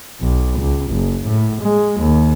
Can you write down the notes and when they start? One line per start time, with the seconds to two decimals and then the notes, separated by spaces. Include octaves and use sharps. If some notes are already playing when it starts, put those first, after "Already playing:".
0.21 B1
0.59 C#2
0.91 F#1
1.26 A2
1.62 G#3
2.00 D#2